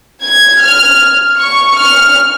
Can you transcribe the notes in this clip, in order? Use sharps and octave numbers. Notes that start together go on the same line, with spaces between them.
G#6
F6
C#6
F6